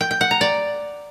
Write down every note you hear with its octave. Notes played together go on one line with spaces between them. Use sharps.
G5
G5
F#5
A#5
D5